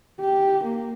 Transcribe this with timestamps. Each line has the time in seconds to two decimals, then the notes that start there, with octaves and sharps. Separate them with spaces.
0.20 G4
0.64 A#3